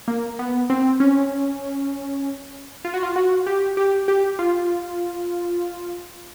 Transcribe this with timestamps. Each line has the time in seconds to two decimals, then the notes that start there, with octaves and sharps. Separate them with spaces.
0.08 A#3
0.39 B3
0.70 C4
1.00 C#4
2.85 F4
2.94 F#4
3.03 F4
3.16 F#4
3.46 G4
3.77 G4
4.08 G4
4.39 F4